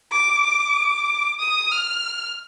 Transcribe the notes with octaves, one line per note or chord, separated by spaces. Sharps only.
D6
D6
D#6
F6